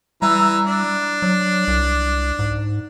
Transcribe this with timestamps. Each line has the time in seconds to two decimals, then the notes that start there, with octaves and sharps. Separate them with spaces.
0.22 E3 G3 E5 A#5
0.67 D4
1.22 F#3
1.68 C2
2.39 G#2